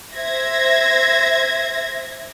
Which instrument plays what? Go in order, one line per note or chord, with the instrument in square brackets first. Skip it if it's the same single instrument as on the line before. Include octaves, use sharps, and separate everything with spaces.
[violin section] C5 E5 G#6 A#6